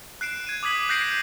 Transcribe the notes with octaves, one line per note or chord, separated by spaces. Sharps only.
F#6 C7 D7 E7
G#6 D#7
D6 D#6 G#6 B6 F#7
F#6 G6 A#6 C7 D7 F#7